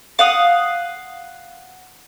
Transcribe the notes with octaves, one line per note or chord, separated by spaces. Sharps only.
F5 F#5 D#6